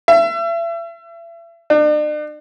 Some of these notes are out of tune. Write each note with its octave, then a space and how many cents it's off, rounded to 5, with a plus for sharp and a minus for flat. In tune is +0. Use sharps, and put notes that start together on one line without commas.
E5 +35
D4 +40